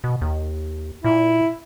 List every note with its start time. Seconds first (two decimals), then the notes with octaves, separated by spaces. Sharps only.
0.04 B2
0.21 D#2
1.04 A#2 E4